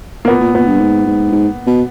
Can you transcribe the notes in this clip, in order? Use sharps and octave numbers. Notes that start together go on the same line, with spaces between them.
A#3
A#2 B3
A#2
A#2 B3
G2
G#2
G#2
G#2
B2